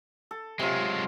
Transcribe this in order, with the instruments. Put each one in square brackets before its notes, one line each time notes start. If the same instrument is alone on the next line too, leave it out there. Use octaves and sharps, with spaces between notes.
[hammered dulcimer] A4
[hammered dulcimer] C3 F4 [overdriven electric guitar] F#3 G#3